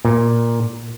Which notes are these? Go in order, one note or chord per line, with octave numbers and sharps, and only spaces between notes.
A#2